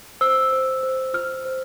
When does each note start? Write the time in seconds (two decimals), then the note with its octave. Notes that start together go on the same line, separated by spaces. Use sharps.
0.21 C5 E6
0.52 C5
0.83 C5
1.14 F4 F6
1.45 C5